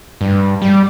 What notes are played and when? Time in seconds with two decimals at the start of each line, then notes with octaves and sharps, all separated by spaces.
0.21 G2
0.62 G3